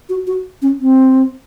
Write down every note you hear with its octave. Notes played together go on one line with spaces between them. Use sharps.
F#4
F#4
C#4
C4